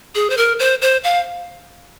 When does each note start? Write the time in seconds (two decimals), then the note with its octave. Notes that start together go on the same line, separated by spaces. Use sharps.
0.15 G#4
0.30 C5
0.37 A#4
0.59 C5
0.82 C5
1.04 F5